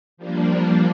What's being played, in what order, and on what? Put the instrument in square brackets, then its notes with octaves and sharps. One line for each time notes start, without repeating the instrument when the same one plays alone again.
[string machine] F3 G3 A#3 D4